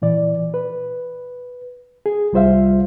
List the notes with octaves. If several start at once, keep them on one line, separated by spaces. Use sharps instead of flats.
A#2 E3 D5
B4
G#4
C2 G3 F4 C5 E5 F5